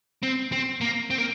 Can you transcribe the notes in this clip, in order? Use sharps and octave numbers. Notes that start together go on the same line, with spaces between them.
C4
C4
A#3
C4
A#3